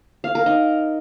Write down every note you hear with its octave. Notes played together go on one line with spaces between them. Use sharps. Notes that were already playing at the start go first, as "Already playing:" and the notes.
F5
A#4
D#4